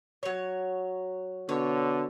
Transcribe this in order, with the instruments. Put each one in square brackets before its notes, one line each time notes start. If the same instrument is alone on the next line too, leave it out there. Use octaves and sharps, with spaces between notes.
[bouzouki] F#3 C#5
[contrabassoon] B2 [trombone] D3 [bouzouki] C#5